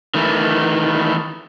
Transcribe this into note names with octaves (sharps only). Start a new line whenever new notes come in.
D#3 E3 A3